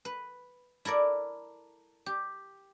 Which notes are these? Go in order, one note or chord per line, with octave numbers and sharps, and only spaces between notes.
B4
E4 A4 A#4 D5
G4